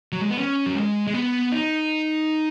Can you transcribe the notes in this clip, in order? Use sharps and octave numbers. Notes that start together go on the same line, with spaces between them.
F#3
G#3
B3
C#4
F#3
G#3
G#3
B3
D#4